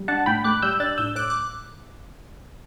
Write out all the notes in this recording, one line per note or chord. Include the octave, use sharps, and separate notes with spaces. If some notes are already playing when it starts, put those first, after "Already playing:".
Already playing: G3
D4 F#5 A5
A2 G5 B5
A2 D6 F#6
G3 E6 G6
D4 F#6 A6
A2 E6 G6
A2 D6 F#6
D6 F#6